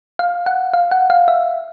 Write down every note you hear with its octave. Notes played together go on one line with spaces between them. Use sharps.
F5
F#5
F5
F#5
F5
E5